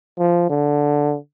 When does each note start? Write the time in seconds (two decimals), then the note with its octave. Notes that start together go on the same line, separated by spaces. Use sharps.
0.18 F3
0.49 D3